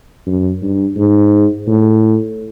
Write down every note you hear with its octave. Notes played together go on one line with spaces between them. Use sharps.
F#2
G2
G#2
A2